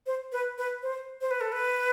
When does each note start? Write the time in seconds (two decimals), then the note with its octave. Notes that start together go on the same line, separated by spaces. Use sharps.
0.07 C5
0.32 B4
0.58 B4
0.83 C5
1.21 C5
1.31 B4
1.41 A4
1.52 B4